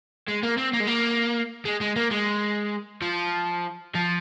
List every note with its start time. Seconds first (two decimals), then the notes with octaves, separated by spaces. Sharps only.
0.28 G#3
0.43 A#3
0.58 C4
0.74 A#3
0.80 G#3
0.88 A#3
1.65 G#3
1.81 G#3
1.96 A#3
2.11 G#3
3.02 F3
3.95 F3